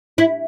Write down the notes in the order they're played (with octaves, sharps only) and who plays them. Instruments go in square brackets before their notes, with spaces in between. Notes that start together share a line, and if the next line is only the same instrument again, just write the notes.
[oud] E4